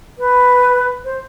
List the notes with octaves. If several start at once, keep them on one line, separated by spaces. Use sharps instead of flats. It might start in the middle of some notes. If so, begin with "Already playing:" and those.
B4
C5